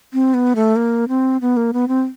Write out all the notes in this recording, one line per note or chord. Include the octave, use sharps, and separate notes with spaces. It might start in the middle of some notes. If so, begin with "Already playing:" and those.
C4
B3
A3
A#3
C4
B3
A#3
B3
C4